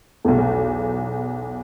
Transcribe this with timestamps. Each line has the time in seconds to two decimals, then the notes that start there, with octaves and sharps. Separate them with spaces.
0.25 B1 E2